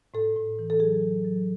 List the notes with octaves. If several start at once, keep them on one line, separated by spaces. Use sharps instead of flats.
A2 A4
A2
E3
A4
F#3 G#4
F#3
F#3